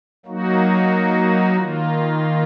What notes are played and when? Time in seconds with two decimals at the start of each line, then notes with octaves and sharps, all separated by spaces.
0.26 F#3 A#3 D#4 F#4
1.57 D#3 A#3 F4